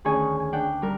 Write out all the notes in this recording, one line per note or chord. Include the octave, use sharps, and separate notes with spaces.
D2 D#3 C#4 G#4 C#5 G#5
G#5
D4 F#5 G5
G3 A#4